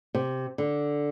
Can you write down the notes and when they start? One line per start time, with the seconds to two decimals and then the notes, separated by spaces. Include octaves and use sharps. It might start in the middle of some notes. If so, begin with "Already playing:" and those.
0.15 C3
0.58 D3